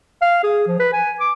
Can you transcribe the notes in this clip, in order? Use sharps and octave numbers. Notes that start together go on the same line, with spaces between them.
F5
G#4
F3
B4
G#5
D6